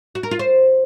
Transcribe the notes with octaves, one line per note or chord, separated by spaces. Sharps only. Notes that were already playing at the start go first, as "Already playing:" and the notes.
F#4
A#4
F4
C5